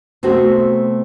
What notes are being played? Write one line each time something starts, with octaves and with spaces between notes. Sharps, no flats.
C3 A3 B3 F#4 C5